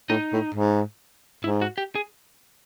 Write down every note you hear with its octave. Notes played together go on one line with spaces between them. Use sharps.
A2 D#4
A2
G#2
G#2 E4
F#4
G4
G#4